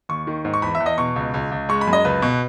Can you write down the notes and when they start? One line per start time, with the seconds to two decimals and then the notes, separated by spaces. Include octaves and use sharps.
0.09 D#2 C#6
0.27 D#3
0.45 G#2
0.54 C#6
0.62 E2 B5
0.75 E5
0.80 E2
0.86 D#5
0.98 B2 C#6
1.16 C#2
1.34 C#2
1.51 C#2
1.69 G#3 C#6
1.81 B5
1.87 F#2
1.93 D#5
2.05 C#2 B4
2.22 B2